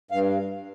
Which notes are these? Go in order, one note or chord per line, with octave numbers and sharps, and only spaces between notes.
G2 F5